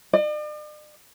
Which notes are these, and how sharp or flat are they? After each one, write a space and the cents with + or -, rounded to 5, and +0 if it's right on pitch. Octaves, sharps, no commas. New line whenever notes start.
D5 +45